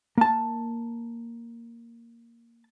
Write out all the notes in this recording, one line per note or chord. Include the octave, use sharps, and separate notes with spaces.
A#3 A5